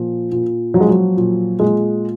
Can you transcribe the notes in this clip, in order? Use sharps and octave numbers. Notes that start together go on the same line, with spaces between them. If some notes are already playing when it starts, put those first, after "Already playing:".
Already playing: A#2 F3
A#2
F3 F#3
G#3
F#3
A#2
A#2 G#3